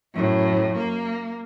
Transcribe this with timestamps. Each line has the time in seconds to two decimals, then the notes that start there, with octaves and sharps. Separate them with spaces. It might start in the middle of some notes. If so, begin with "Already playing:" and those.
0.14 F#2 A2
0.77 A#3